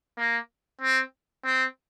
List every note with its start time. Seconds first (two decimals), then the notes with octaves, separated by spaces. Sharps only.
0.18 A#3
0.82 C4
1.45 C4